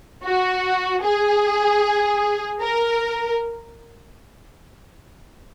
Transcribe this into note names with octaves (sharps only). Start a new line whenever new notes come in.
F#4
G#4
A#4